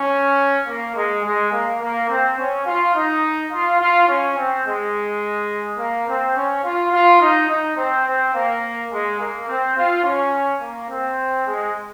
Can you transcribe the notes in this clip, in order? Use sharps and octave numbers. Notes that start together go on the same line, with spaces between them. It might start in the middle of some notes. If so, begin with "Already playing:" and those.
Already playing: C#4
A#3
G#3
G#3
A#3
A#3
C4
C#4
F4
D#4
F4
F4
C#4
C4
G#3
A#3
C4
C#4
F4
F4
D#4
D#4
C4
C4
A#3
G#3
A#3
C4
F4
C#4
A#3
C4
G#3